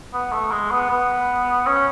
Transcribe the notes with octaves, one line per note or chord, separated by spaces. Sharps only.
B3
A3
G#3
B3
B3
C#4